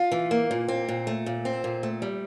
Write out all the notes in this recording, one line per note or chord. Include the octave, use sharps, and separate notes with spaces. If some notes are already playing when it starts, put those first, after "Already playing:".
Already playing: F4
E3
A#3
A#2
C4
A#2
A3
A#2
C4
A#2
A3
G3